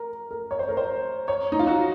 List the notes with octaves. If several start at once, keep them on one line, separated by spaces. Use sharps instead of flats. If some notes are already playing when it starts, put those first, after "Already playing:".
Already playing: A#4
A#4
C#5
C5
A#4
C5
C#5
D#4
F4
F#4